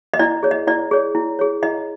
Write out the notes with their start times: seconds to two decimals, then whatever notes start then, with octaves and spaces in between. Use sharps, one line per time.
0.14 D#5
0.19 E4 D5
0.43 G#4 C#5
0.51 D#5
0.67 E4 D5
0.91 G#4 C#5
1.15 E4
1.39 G#4 C#5
1.63 E4 D#5